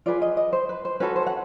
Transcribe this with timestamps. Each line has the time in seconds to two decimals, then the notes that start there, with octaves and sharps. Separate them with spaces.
0.06 F4 G#4 B4 D5
0.22 D#5
0.37 D#5
0.53 C5
0.69 B4
0.85 C5
1.00 C#4 F#4 A4 B4
1.16 C5
1.27 F#5